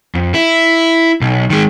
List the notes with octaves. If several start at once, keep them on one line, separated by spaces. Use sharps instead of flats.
F2
E4
B1
D#3 G#3